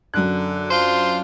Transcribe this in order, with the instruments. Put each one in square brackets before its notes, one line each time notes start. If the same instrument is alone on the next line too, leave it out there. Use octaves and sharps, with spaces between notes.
[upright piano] F#2 F#6 [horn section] D3
[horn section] D4 F4 [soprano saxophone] C5